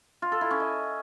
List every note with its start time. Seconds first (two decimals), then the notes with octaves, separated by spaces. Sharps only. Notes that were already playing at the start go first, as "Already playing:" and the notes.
0.22 F4
0.32 A4
0.41 E4
0.51 C#4
0.60 D#5